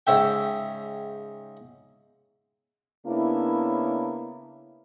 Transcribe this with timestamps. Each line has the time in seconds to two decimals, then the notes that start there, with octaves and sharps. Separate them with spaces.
0.07 G#2 C#3 E5 G5
3.06 C#3 A#3 B3 D4 E4